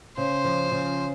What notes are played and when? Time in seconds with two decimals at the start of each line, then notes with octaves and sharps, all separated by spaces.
0.17 C#3 C5
0.44 F3
0.72 C#3